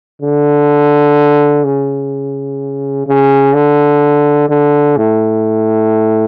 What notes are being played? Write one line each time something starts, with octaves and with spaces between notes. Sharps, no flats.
D3
C#3
C#3
D3
D3
A2